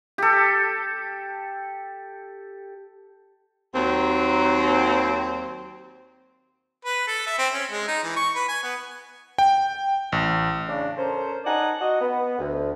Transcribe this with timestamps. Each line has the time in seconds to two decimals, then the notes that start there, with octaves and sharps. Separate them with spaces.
0.18 G4 A4
3.75 D#2 F#3 C4
6.85 B4
7.07 A4
7.26 E5
7.39 C4
7.54 C#4
7.71 G#3
7.88 D#4
8.04 E3
8.16 C#6
8.35 B4
8.48 G#5
8.63 B3
9.38 G5
10.12 A1
10.68 C#3 D4
10.97 C#4 A4 A#4 C5
11.45 D#4 D5 F#5 G#5 A5
11.81 F#4 D#5
12.01 B3
12.38 D2